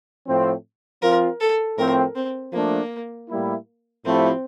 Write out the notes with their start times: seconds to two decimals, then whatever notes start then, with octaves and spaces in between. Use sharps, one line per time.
0.27 A2 F3 C4
1.02 F3 C4 F4 A#4
1.40 A4
1.78 A2 F3 C4 A#4
2.16 C4
2.53 F3 A3 A#3 D4
3.29 A2 G3 A#3 E4
4.05 A2 F3 A3 C4 E4 G4